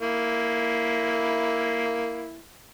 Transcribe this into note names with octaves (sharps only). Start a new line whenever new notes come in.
A#3 E4